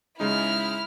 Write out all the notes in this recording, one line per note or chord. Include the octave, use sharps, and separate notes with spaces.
C#3 G#3 D#4 E4 F6